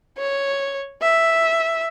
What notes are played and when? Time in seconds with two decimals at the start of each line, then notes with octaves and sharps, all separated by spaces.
0.18 C#5
1.01 E5